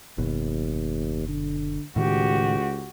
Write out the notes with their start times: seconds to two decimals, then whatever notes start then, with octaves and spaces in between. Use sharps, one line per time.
0.18 F#1 D#2 B2
1.28 D3
1.96 C#2 A2 D#3 F#4 G4